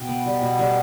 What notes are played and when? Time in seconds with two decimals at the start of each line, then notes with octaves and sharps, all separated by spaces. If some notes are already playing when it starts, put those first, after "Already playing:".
Already playing: B2 G5
0.08 B3
0.26 G3
0.42 B2
0.59 G3